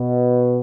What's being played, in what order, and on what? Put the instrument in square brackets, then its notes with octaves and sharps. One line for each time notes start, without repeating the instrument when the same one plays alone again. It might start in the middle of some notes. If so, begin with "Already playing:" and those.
Already playing: [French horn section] B2